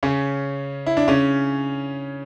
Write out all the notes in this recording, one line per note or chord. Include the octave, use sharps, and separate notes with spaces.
C#3 C#4
E4
D4
C#3 C#4